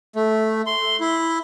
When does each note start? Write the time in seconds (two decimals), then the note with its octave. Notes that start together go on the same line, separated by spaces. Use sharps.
0.16 A3
0.66 C6
1.00 E4